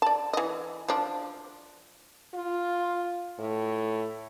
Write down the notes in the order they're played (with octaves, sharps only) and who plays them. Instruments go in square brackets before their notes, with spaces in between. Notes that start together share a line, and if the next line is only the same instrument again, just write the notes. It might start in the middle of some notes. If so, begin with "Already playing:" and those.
[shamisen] D5 A5
E3 D#5
F3 D4
[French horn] F4
A2